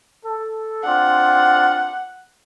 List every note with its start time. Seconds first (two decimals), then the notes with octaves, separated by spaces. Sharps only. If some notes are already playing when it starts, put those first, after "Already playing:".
0.25 A4
0.84 C4 D4 F4 F#5